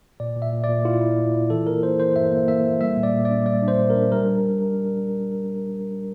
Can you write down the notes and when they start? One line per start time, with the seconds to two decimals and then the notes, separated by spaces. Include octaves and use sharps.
0.20 A#2 D5
0.36 A#2
0.42 E5
0.52 A#2
0.64 D5
0.69 A#2
0.85 E4 F4
1.01 E4
1.18 A#2
1.34 E4
1.50 E3 A4
1.67 A#3 A#4
1.83 A#3 C5
1.99 E3 C5
2.15 G2 E5
2.32 A#3
2.48 A#3 E5
2.65 A#3
2.80 G3 E5
2.97 A#2
3.03 D5
3.13 A#2
3.25 D4 D5
3.46 G3 D5
3.63 D4
3.68 C5
3.79 A#2
3.90 A#4
3.95 D4
4.12 G3 A#4